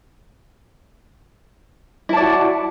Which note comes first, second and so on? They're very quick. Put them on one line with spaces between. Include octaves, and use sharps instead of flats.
E4 A5 D5 F#4